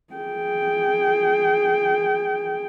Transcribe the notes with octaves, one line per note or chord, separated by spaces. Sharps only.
G#4 G5